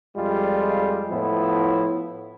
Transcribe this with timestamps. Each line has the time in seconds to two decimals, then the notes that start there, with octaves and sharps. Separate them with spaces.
0.16 F2 G3 G#3 F4
1.11 A2 F3 B3 E4